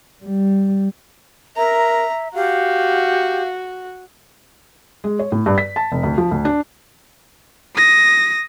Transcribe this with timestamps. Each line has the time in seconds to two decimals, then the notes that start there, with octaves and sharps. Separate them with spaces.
0.23 G3
1.57 A#4 E5 A#5
2.35 F#4 G4 F5
5.04 G#3
5.19 C#5
5.32 A2
5.46 G2
5.58 B6
5.76 A5
5.92 F1
6.03 D2
6.18 F3
6.31 D2
6.45 D4
7.76 D#6 A#6